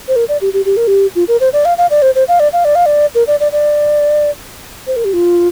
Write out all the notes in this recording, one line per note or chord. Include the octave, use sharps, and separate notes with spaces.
C5
A#4
D5
G4
G4
G4
A#4
G4
F4
A#4
C5
D5
F5
F5
D5
C5
C5
F5
D5
F5
D5
F5
D5
A#4
D5
D5
D5
C5
A#4
G4
F4